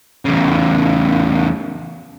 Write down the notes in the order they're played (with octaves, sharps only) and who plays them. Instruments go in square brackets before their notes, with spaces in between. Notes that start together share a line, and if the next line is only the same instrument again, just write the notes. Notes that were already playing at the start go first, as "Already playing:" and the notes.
[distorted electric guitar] E2 C#3